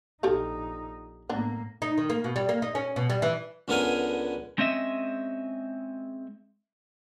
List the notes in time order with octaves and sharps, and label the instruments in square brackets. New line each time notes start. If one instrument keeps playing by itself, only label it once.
[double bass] A#1 D#4 [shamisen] G4 A4 F5
[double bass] A2 A#3 [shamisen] B3 D4
[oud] D#4
D#3
A#3
B2
G3
A#3
D#4
C#4
B2
G3
E3
[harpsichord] C#2 D3 B3 A#4 G#5
[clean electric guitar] G#3 C4 C#4 D#5 E5